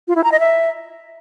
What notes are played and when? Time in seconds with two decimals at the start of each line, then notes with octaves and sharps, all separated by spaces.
0.08 F4
0.16 E4
0.24 A#5
0.32 D#5
0.40 E5